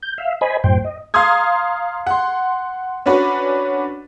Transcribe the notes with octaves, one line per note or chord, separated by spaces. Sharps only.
G6
E5 F5
C5 D#5 G#5 B5
F#2 A2 C5 G5
D#5
F5 A#5 C6 D#6 G#6
F#5 C6
C#4 D4 F#4 B4